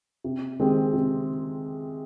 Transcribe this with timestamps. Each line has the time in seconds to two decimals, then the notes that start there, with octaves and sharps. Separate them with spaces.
0.24 C3
0.60 D#3 G#3 C4 G4
0.94 C3